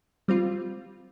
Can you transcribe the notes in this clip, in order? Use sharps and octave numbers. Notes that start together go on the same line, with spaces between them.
G3 C4 F4